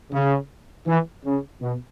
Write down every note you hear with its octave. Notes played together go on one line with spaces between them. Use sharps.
C#3
E3
C#3
B2